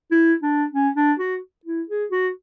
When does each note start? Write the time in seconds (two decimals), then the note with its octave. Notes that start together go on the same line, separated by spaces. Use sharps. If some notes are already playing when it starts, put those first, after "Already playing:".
0.12 E4
0.43 D4
0.73 C#4
0.96 D4
1.20 F#4
1.66 E4
1.89 G#4
2.12 F#4